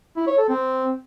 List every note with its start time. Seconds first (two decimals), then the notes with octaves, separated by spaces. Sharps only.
0.16 E4
0.27 C#5
0.38 A4
0.49 C4